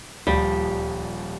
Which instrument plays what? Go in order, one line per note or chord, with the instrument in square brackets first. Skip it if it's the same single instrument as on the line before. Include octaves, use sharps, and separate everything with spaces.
[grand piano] D#1 F3 G7 [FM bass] D2 [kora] G3